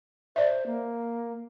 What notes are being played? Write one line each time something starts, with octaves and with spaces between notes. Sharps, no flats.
C5 D5 E5
A#3